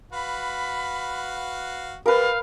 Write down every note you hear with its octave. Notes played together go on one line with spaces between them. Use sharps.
F#4 B4 F5 B5
G3 A#4 B4 F5